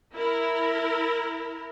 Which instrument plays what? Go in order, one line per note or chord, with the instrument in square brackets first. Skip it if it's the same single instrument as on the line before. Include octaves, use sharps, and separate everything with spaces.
[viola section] E4 A#4